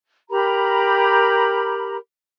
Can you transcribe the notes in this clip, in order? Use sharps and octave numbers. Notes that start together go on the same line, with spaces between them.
G4 A#4 A#5 B5